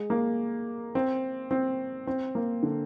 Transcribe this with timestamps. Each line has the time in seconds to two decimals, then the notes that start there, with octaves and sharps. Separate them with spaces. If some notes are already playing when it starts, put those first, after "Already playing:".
Already playing: G#3
0.10 A#3
0.95 C4
1.51 C4
2.07 C4
2.35 A#3
2.63 D3